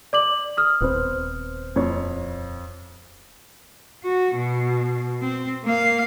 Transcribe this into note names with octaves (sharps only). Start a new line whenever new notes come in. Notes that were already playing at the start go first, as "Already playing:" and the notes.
D5 D6 F#7
D#6 F6
D#1 B3 C4 C5
F2 C#5
F#4
B2
C4
A#3 F5